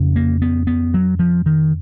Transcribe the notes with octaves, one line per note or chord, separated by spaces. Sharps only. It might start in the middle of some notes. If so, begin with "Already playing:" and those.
Already playing: F2 C#3
A#3
B3
B3
F#3
F3
D#3